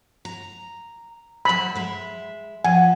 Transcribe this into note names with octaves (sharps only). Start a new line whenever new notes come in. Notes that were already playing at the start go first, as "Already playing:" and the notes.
A#5
F#3 C5 B5
G#3 E5
F3 F#5 G#5